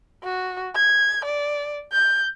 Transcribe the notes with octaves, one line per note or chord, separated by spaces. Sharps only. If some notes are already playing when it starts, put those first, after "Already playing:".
F#4
G#6
D5
G6